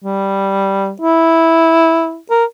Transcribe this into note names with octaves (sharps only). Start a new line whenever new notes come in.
G3
E4
A#4